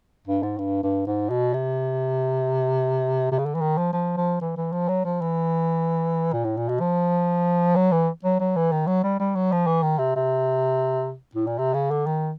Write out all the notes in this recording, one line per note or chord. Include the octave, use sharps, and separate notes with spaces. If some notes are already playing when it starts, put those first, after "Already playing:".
G2
G#2
G2
G2
G#2
B2
C3
C3
C#3
D3
E3
D#3
F3
F3
F3
E3
E3
F3
F#3
F3
E3
A#2
A2
A#2
B2
F3
F#3
E3
F#3
F#3
E3
D#3
F#3
G3
G3
F#3
F3
E3
D#3
C3
C3
A2
A#2
C3
C#3
D3
D#3